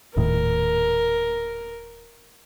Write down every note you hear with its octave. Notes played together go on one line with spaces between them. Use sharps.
D#1 A2 D#3 A#4